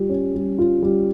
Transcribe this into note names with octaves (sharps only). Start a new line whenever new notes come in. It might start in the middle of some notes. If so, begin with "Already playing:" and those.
Already playing: G3 F4
C#4
G3
F4
G3